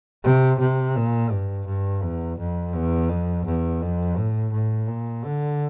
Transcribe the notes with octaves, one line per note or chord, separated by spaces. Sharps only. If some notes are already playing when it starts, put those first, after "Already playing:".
C3
C3
A#2
G2
G2
E2
F2
E2
F2
E2
F2
A2
A2
A#2
D3